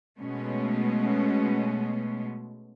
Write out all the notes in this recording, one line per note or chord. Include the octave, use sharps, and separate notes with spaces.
B2 G#3 A3 B3 C#4